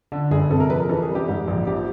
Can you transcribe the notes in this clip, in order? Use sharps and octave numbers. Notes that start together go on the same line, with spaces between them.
D3 D4
G1 G#4
C3 A4
A#4
F2 B4
A#4
E3 A4
G#4
G3
G4
G#2
A#1
F3 G4